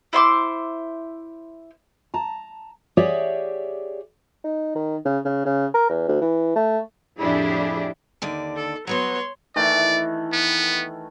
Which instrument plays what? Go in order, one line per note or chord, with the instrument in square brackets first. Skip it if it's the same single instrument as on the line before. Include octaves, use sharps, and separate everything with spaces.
[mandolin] E4 C5 C6 D6
[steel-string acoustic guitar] A5 A#5
G4 G#4 C#5 D5 E5 F#5
[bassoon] D#4
D#3
C#3
C#3
C#3
A#4
E2
D2
E3
A3
[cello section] F2 A2 D4 E4 G4 G#4
[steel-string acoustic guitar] D#2 D3 D5
[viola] A4
[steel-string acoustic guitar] F#3 B3 F#4 [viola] C#5 C6
[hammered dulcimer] D#3 E3 A3 [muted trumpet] D5
[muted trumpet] B3